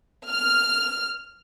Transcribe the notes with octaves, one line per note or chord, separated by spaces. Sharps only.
F6